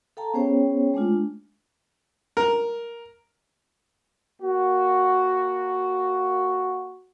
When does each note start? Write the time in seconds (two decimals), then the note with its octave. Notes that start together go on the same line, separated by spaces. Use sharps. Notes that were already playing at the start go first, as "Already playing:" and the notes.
0.17 A4 F5 G5 A5 A#5
0.34 B3 C#4 G#4 C5 C#5 G5
0.94 G#3 A3 D4 F4
2.37 A#4
4.42 A#3 F#4